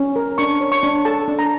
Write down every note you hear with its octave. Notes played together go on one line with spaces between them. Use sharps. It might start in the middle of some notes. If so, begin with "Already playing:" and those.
Already playing: C#4
A#4
D4 C#6
C#5
C#6
D4
A4 A5
D4
A#5